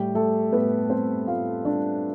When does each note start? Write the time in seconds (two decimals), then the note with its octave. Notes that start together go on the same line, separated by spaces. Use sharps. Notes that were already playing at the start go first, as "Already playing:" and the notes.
Already playing: A2 G3 G4
0.15 G3 A3 A4
0.52 A2 B3 B4
0.89 G3 C4 C5
1.27 A2 F4 F5
1.65 G3 D4 D5